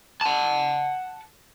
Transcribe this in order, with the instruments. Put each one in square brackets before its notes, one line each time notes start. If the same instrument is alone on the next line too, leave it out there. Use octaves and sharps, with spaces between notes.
[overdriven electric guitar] F#5 A5